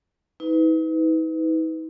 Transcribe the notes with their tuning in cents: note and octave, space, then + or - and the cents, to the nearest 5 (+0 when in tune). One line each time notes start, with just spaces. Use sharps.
D#4 +45 B4 +20